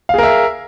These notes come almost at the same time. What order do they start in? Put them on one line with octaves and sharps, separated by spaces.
F5 G#4 A#4 E5